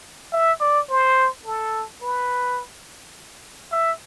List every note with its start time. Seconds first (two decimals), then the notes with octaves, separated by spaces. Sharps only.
0.33 E5
0.61 D5
0.90 C5
1.46 A4
2.02 B4
3.72 E5